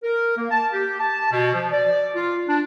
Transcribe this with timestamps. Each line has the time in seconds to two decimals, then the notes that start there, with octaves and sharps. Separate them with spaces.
0.03 A#4
0.37 A#3
0.51 A5
0.73 G4
0.99 A5
1.32 B2
1.53 F3
1.71 D5
2.16 F4
2.47 D4